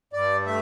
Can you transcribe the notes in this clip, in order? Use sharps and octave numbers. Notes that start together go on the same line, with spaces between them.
G2 D5
A3 E5